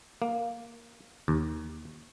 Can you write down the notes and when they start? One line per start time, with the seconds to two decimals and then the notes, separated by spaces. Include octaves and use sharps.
0.22 A#3
1.28 D#2